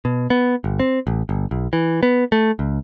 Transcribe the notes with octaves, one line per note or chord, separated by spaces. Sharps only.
B2
B3
G1
C4
A1
G1
B1
E3
B3
A3
C#2